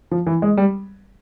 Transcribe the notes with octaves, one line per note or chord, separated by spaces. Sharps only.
F3
E3
G#3
G3